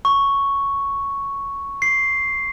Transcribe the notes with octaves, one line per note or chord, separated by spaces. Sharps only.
C#6
C7